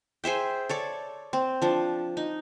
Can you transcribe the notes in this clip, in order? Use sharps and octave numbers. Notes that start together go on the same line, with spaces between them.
G#4 C5 E5 G5
A4 C#5 D5
C4
F3 D4
D#4